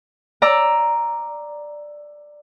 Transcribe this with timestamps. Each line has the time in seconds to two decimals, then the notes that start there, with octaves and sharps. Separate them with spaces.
0.42 D5 A#5 E6